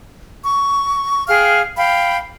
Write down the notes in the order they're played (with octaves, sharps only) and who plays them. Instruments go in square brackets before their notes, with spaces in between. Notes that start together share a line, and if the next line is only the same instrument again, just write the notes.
[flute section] C#6
G#4 F5 G5 F6
F5 G5 B5